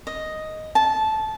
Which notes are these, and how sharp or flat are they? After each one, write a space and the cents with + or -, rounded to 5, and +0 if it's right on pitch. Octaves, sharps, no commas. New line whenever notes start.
D#5 +5
A5 -15